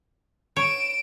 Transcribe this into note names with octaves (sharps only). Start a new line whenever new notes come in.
C#5 D7 E7